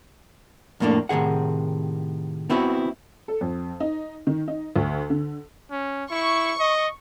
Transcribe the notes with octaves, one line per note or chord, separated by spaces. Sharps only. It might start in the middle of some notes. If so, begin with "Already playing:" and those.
F2 A2 A3 A#3 D4
A2 C3 D#3 G#4 F#5
B3 C4 E4 F#4 B4
A4
F2
D#4
D#3
D#4
D2
D3
C#4
E4 C#6
D#5